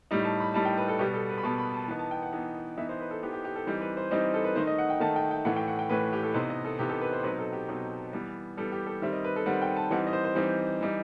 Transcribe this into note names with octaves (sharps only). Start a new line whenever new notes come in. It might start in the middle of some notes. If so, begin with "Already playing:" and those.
A2 G3 D#4
A5
B5
A2 G3 D#4 A5
G5
B4
A4
B2 G3 B3 G4
A4
B4
B5
B2 G3 B3 A5
B5
A5
E3 B3 D#4 A5
A5
G5
F#5
E3 B3 D#4
E3 B3 D#4 E5
C5
B4
A4
E3 B3 D#4 G4
G4
G4
A4
E3 G3 C4 D#4 C5
B4
C5
E3 G3 C4 D#4 D#5
A4
B4
D#3 A3 D#4 C5
D#5
F#5
G5
D#3 A3 D#4 A5
G5
G5
A2 E3 A3 F#5
G5
F#5
G5
A2 E3 A3 B4
G4
A4
C3 E3 B3 D#4 C5
D#5
A4
C3 E3 B3 D#4 G4
A4
B4
C5
B2 F#3 C4 D#4 B4
A4
G4
B2 F#3 C4 D#4
E3 G3 B3
E3 G3 B3 A4
G4
A4
D#3 G3 C4 E5
D#5
B4
A4
D#3 G3 C4 F#5
G5
A5
E3 G3 C4 D#4 F#5
D#5
C5
C5
E3 G3 C4 D#4
E3 G3 D#4